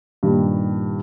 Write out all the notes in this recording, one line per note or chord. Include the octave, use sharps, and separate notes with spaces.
G2 A#2 D#3 G3